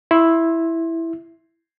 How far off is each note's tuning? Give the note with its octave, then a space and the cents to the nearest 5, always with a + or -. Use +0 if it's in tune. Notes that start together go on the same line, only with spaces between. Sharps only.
E4 +0 C6 +20